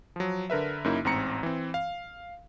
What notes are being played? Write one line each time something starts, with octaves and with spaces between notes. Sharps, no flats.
F3 F#3
D3 A#4 B4 E5
F#2 C#3 A#3 D#4 E4
A1 G#2 C4 A#5 C#7
E3 C4
F5